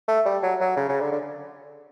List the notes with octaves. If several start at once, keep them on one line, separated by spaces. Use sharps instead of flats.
A3
G3
F#3
F#3
C#3
C#3
D3
D3